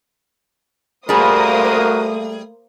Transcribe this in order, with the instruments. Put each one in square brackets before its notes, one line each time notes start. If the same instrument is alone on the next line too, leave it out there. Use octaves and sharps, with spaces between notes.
[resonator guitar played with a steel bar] G3 G#4 [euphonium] A3 [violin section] A#3 C5 D#6 [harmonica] F#4 A#4